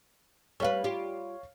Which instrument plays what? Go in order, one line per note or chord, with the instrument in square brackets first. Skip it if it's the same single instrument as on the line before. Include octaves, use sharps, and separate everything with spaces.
[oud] G3 G#4 B4 [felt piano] C#5 F5
[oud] F4 G4